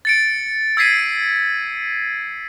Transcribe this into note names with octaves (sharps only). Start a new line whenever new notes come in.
A6 C#7 D7
E6 G#6 B6 C7 D#7